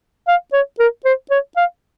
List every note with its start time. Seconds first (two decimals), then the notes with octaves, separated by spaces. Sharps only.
0.28 F5
0.53 C#5
0.79 A#4
1.05 C5
1.31 C#5
1.57 F5